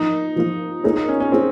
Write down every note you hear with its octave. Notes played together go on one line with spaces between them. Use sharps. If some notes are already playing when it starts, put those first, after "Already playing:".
Already playing: F3 A#3 D#4 F4
F3 A#3 F4
A#3 D#4 F4 G#4 C#5
D#4
C#4
C#4
A#3 C4 F4 G#4 C#5